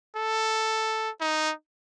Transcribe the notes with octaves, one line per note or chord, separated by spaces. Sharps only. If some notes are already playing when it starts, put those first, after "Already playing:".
A4
D#4